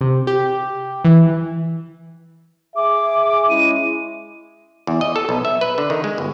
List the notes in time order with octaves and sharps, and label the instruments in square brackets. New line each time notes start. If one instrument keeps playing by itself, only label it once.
[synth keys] C3
G4
E3
[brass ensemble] G#4 E5 [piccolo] D6
[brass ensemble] G#3 C#4 E4 [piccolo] D#7
[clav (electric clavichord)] E2
D#5
A4
B1
E5
B4
D3
D#3
G#3
G1